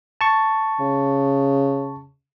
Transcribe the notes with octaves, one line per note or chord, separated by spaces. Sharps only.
A5 C#6
C#3